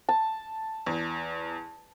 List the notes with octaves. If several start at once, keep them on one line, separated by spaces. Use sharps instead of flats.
A5
E2